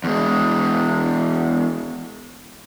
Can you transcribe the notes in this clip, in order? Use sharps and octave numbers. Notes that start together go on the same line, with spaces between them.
E2 G#3